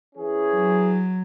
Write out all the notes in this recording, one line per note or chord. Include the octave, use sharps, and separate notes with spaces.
E3 C#4 G#4
F#3